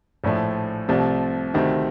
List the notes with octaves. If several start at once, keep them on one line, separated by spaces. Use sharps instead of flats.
A#1 A2 F3 A3
C2 C3 F3 A3
D2 C3 D#3 A3 C4